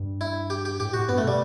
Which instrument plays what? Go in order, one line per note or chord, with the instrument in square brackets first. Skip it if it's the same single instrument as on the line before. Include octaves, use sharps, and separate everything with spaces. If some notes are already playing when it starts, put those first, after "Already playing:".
Already playing: [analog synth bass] G2
[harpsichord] E4
G4
G4
[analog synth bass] A2 [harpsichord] G4
[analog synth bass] A2 [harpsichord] F#4
[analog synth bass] G2 [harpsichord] B3
[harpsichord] A3
[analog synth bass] B2 [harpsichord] G3